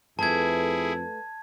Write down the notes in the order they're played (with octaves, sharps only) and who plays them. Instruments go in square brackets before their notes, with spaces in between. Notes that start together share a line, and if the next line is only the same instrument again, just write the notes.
[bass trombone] F2 [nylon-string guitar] A3 B4 [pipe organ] E4 G#4 [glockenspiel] A5 G#6